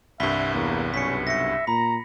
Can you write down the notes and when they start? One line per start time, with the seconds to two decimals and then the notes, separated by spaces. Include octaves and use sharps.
0.20 C2 G2 E5 B5 B6 G7
0.54 E2 A#3
0.94 B1 C#4 B6 C#7
1.27 E5 A#6 C#7
1.67 A#2 A#5 B5